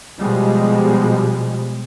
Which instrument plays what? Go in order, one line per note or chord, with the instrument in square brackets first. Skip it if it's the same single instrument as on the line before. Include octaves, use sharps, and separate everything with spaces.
[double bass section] B2 F3 G3 G#3